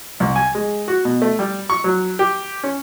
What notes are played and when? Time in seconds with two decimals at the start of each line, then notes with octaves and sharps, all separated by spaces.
0.20 C2
0.36 G#5
0.55 G#3
0.88 F#4
1.05 B2
1.22 A3
1.39 G3
1.70 C#6
1.84 F#3
2.19 G4
2.63 C#4